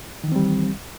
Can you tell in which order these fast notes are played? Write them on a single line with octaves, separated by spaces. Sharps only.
D#3 E3 C4 G3